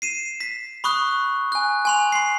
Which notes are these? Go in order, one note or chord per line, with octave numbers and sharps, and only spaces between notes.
C7 D#7 E7
B6
B5 C#6 D#6 F#6
G#5 F#6
G#5 C6 F7
C6 C7